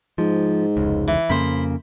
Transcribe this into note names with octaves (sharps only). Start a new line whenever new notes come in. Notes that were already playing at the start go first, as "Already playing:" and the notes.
G#2 F3
F1 C#2
E3
F2 C#3 A#3 C5 B5